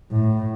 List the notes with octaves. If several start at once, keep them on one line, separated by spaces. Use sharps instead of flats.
A2